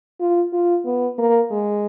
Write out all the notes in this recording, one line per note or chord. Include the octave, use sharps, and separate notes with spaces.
F4
F4
B3
A#3
G#3